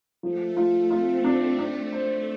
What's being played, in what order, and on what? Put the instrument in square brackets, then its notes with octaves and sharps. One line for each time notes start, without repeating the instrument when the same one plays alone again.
[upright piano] F3 [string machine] A3
[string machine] A3 [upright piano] F4
[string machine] C4 [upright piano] F4
[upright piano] D4
[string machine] A3 [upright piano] D4
[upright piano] C5